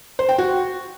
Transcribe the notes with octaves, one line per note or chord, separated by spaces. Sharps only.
C5
G5
F#4